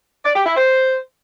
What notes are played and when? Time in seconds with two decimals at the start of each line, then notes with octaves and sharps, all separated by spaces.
0.25 D5
0.36 G4
0.46 E4
0.57 C5